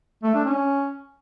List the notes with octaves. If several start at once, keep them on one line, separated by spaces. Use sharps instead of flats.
A3
D4
C#4